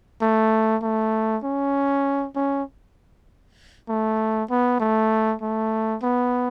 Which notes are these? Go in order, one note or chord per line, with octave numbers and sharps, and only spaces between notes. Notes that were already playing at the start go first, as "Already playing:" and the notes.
A3
A3
C#4
C#4
A3
B3
A3
A3
B3